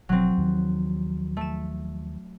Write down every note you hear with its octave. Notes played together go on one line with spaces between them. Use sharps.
G1 B2 F3 F#3 C4
D#2 D#3 F3
A3 E7